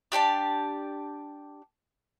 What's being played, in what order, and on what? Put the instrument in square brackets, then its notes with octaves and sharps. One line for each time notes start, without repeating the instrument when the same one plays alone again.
[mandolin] D4 G4 D5 A5